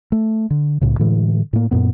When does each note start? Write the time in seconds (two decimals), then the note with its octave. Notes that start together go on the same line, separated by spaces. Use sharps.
0.12 A3
0.50 D3
0.81 C2 A2 C#3
0.99 A2 D3 E3 G#3
1.53 A2 A#3
1.71 F#2 A#2 B3